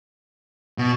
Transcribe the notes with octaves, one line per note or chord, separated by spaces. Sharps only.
B2